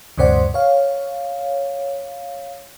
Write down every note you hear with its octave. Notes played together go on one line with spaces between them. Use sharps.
D2 G2 C3 C5 D5 F#5
C#5 F5